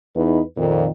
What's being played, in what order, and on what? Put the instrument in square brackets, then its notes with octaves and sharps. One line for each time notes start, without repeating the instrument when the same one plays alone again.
[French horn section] E2 D#4 B4
F2 A#2 D#3